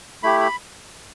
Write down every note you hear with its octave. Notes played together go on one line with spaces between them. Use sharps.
A3 E4 G4 B5
B5